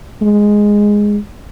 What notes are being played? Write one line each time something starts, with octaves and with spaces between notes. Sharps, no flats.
G#3